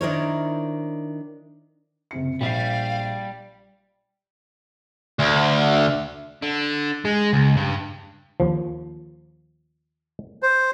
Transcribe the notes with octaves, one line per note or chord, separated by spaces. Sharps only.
D#3 D4 E4 A#4 C5 C#5
F#1 C3 C#7
A#1 G3 F5 B6 C7
D2
D3
G#3
C#2
G2
D#2 F3
C5